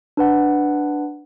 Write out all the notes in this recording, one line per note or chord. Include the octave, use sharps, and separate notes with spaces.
D4 B4 F#5